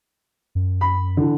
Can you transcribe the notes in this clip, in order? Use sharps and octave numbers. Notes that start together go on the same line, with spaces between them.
F#2
B5
D3 E3